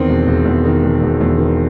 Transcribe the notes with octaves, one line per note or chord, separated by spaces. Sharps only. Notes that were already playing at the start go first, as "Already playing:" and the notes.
Already playing: E2 D#3 C4
E1
E1
E2
D#3
E1
E1
E2
D#3